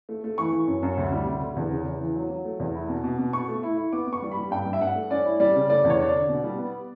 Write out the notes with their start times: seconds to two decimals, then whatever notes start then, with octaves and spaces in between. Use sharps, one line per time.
0.09 A3
0.24 A3
0.38 E3 C#6
0.53 E3
0.67 F#2
0.83 F#2
0.97 D2
1.12 G3
1.27 D2
1.42 D3
1.56 E2
1.71 C#3
1.86 E2
2.01 E3
2.15 F#3
2.30 F#3
2.45 A3
2.60 E2
2.74 E4
2.89 B2
3.04 B2
3.19 B2
3.33 B2 C#6
3.48 A3
3.63 E4
3.77 E4
3.93 B3 D6
4.07 B3
4.13 C#6
4.22 G3
4.32 B5
4.37 G3
4.51 G2 G5
4.66 G2
4.73 E5
4.81 G2 F#5
4.95 A3
5.10 C#4 D5
5.25 E4
5.40 G3 D5
5.55 C#3
5.69 A3 D5
5.84 E2
5.90 C#5
5.99 D4
6.09 D5
6.14 D3
6.29 B2
6.44 G3
6.58 B3